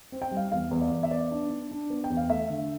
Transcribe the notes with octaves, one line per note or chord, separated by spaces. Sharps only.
C4
G5
G3
F5
E2 F5
E2
D5
E2
E5
B3 D5
D4
D4
D4
B3
G5
E2
F5
A3 E5
D3